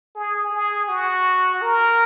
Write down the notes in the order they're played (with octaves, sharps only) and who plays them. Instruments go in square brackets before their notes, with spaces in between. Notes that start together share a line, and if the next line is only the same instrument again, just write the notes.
[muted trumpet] G#4
G#4
F#4
A#4